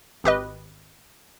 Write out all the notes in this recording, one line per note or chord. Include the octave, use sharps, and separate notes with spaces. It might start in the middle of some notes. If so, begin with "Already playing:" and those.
G#1 G4 B4 D#5